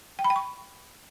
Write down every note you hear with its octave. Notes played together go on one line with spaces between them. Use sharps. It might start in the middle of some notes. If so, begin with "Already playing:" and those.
G5
B5
G5
C#6